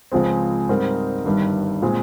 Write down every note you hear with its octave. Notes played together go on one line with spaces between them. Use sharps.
C#2 C#3 F3 G#3 C4
G#2 G3 C4 D#4 A#4
G1 G2 D#3 G3
A#2 G#3 C4